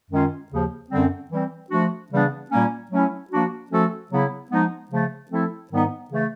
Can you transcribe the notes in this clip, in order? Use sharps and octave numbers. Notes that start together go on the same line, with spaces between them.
F#2 D#3 G#3 C#4 F4
D#2 C#3 F3
F#2 D3 G3 C4
E3 G3 C4
F3 A3 D4 F#4
C#3 E3 G3 B3 D4
A#2 G3 A#3 C#4
F#3 A3 C#4 E4
F3 A#3 D4 F#4
F3 A3 C#4 F#4 A4
C#3 F#3 B3 E4
F3 G#3 B3 D#4
C#3 F3 A3
F3 A3 C4 E4 A4
G#2 D#3 G3 B3 D#4
C#3 E3 A3